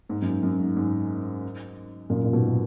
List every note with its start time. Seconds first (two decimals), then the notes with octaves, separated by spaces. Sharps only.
0.09 G#2
0.22 F#2
0.26 G#2
0.43 F#2
0.60 G#2
0.76 G#2
2.10 F#2 A#2
2.24 A#2
2.33 G#2 B2